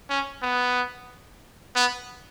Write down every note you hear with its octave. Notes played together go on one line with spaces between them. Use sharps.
C#4
B3
B3